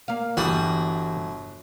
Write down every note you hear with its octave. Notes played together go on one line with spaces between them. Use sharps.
A#3 F5
G1 E3 G3 F#4 E5 D#6